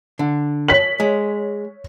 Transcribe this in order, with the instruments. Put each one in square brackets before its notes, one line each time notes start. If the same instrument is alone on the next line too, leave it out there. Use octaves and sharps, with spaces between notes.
[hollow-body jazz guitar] D3
[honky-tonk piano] C#5 B6 F#7
[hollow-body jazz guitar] G#3